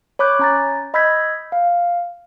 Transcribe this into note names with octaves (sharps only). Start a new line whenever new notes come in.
C#5 B5 D6 F#6 G6
C#4 A#5 A6
D#5 B5 E6 G6 G#6 B6
F5